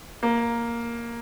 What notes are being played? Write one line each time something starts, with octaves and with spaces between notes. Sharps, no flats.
A#3